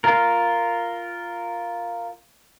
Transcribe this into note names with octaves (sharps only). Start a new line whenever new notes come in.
F4 A#4